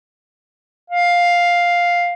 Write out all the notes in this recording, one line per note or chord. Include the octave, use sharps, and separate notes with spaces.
F5